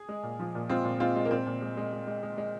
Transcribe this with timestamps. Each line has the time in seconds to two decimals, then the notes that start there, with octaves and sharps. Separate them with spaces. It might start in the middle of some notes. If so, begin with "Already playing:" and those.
Already playing: G#4
0.09 G#3
0.23 A#2
0.40 F3
0.55 A#2
0.69 G#3 C4 F4
0.84 A#2
1.00 G#3 C4 F4
1.16 G#3
1.25 A#3
1.31 A#2 C4
1.46 A#2
1.62 G#3
1.77 G#3
1.92 G#3
2.07 G#3
2.23 G#3
2.38 G#3